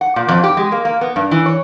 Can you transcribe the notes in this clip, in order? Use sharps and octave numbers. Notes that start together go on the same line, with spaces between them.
F#5
A#2
F2
G4
G#3
A#3
A#3
B3
G2
E3
C#5